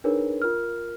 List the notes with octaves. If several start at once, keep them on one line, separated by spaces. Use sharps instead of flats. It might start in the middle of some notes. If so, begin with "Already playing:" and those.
D4 D#4 G#4 A#4 B4 C#5
F4 A#4 F6